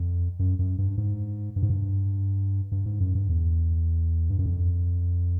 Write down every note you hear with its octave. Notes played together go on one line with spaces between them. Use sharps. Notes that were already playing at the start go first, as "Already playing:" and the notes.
Already playing: F2
F#2
F#2
G2
G#2
G2
G#2
G2
G2
G#2
F#2
G2
E2
G2
F#2
F2